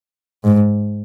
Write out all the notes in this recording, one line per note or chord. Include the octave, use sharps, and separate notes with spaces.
G#2